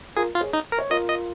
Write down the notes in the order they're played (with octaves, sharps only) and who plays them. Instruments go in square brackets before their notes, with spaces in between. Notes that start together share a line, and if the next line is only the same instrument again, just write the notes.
[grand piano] F4 A#4 [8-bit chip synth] G#4
[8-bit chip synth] F4
[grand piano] G#4 C#5
[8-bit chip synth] D#4
A#4
[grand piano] C#5
[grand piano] F4 A#4 [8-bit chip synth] D#5
[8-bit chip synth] D#5